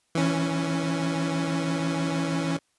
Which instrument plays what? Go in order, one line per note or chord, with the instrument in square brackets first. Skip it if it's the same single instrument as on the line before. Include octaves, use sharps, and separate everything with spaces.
[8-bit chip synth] E3 C#4